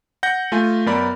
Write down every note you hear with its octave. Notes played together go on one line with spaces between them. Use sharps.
F#5 G6 A#6
A3 F4 G#5
F#2 B3 A#4 D5 B5